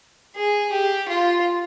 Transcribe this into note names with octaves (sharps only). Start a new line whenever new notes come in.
G#4
G4
F4